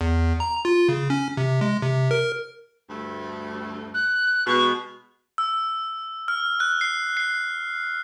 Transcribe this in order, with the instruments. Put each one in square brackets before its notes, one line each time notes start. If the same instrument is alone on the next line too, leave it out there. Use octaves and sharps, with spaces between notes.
[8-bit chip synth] E2
A#5
F4
C#3
C#4
C3
G#3
C3
A#4
[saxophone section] D2 G2 A3
[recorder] F#6
[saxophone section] B2 G#3 [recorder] C#6
[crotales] E6
F6
F#6
C7
C7